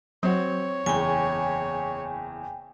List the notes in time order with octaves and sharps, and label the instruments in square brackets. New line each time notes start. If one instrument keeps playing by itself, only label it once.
[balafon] F#3 [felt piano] C4 F#4 [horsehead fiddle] C#5
[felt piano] F#1 E2 [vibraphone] G5 G#5